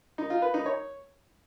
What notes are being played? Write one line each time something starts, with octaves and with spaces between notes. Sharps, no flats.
D#4
F4
B4
D#4
C#5